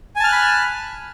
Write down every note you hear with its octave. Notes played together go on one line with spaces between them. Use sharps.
G#5 A5 B5 F6 F#6